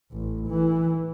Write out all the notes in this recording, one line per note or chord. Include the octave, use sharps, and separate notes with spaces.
A1
E3